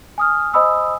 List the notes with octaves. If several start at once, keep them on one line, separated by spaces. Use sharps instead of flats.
G#5 D#6 F6
C5 D#5 G#5 B5 D#6 E6